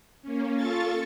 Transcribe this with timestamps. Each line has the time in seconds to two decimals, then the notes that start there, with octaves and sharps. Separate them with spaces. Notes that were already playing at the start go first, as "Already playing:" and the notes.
0.22 A#3 C#4
0.55 F4 A4 C#6 A6